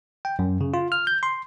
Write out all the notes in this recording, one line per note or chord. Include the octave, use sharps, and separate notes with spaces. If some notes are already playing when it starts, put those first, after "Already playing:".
G5
F#2
C#3
F4
F6
G6
C6